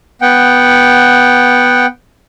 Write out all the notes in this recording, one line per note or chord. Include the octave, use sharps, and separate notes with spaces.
B3 F#5 G5